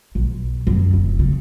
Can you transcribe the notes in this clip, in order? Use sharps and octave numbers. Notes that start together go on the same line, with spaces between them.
B1
F#2
F1
C#3